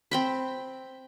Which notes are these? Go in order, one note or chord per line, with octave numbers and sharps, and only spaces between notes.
C4 G5 B5